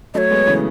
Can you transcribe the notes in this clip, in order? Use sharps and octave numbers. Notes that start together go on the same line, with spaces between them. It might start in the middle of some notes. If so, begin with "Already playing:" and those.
F#3 A3 C#5 D#5
G#3 B3
C#3 E3